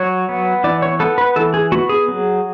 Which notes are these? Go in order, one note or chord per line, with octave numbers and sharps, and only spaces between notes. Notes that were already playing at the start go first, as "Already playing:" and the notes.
Already playing: F#3 C#5
B3
E3 D5
C#5
B3 A4
B4
E3 A4
G#4
B3 F#4
G#4
F#3